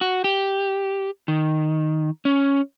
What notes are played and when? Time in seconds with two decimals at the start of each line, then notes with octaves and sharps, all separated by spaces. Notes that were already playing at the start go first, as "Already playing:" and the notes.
0.01 F#4
0.24 G4
1.28 D#3
2.25 C#4